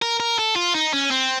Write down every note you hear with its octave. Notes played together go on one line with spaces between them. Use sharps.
A#4
A#4
A4
F4
D#4
C#4
C4